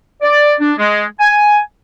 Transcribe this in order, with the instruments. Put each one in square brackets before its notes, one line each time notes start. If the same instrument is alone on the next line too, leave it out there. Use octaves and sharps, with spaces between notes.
[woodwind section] D5
D4
G#3
G#5